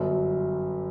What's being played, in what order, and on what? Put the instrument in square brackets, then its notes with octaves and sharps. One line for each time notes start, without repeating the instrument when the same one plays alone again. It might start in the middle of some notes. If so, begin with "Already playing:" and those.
Already playing: [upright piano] G1 F#2 F#3